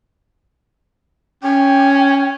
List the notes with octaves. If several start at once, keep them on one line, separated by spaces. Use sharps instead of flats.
C#4 G5